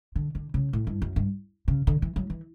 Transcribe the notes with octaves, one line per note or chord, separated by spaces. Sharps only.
D3
D3
C#3
A2
G2
F#2
G2
C#3
D3
E3
F#3
E3